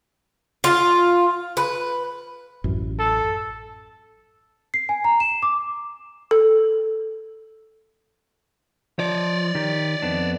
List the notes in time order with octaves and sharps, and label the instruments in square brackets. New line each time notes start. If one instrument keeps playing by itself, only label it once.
[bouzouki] F4
B4
[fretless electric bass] A1 F#2
[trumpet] A4
[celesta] C7
G#5
A#5
E7
D6
[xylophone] A4
[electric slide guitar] F3 [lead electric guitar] C#5 D5
[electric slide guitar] D#3 G4
F2 B3 D4